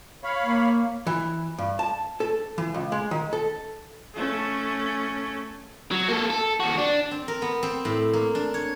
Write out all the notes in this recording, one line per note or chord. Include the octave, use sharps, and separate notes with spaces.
C#5 F5 B5
A#3
E3
G2
A5
A4
E3
C#2
G#3
D#3
A4
A3 C#4
F#3
A#3 A4
A4
D#2 F#4
D4
C4
A#4
B3
C4
A2
A#3
D4
C#5